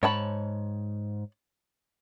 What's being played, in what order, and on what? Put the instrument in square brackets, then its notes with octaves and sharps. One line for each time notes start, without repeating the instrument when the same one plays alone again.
[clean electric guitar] G#2 [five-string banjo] C#5 A5 B5